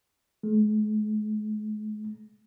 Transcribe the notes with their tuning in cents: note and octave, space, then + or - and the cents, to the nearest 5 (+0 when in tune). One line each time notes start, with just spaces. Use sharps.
G#3 +45